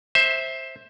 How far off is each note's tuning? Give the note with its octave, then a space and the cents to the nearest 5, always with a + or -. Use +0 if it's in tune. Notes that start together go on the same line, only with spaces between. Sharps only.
C5 +15 E5 -15